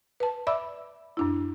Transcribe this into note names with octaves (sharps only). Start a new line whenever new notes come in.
B4 A5
D5 E5 B5 D6 E6
F#2 D4 E4